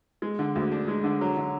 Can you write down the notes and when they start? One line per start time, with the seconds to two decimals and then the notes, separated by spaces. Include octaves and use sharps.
0.22 G#3
0.39 D3
0.55 D2
0.72 D4
0.88 G#3
1.04 D3
1.21 F#3
1.37 D3